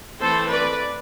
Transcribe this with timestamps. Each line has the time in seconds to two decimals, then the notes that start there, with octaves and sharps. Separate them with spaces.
0.20 E3 A3 C4 A4 C5
0.50 B4 D5